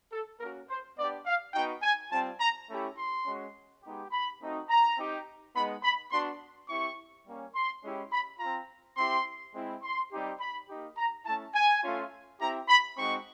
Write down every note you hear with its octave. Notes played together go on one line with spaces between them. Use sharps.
A4
A#3 C#4 F#4 A#4
C5
B3 D4 G4 D5
F5
B3 D#4 F#4 G5
G#5
G3 C4 F4 A5
A#5
A3 C#4 E4 G4
C6
G#3 C#4 F#4
G#3 B3 D#4 G4
B5
A3 C4 D#4 F#4
A#5
C4 D#4 G4
G#3 B3 D#4 B5
B5
B3 D4 F#4 C6
C4 E4 G4 C#6
G3 A#3 C#4
C6
G#3 C#4 E4 G4
B5
C4 F4 A#5
C4 E4 G4 C6
G#3 C4 E4
C6
G3 C4 D#4 G4
B5
A#3 D#4 G4
A#5
A3 C#4 E4 A5
G#5
A3 C#4 F4
C4 E4 G4 A#5
B5
G#3 C4 D#4 F#4 C#6